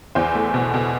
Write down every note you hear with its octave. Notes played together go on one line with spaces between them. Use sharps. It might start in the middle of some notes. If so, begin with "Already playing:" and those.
E2 C5
A3
B2
B2